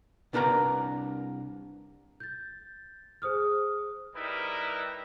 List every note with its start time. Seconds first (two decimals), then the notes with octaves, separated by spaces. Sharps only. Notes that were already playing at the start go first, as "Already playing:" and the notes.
0.33 C2 D4 A#4 B4 A#5
2.20 G6 A6
3.22 G#4 C5 D#6 F6
4.16 G3 D#4 E4 A#4 B4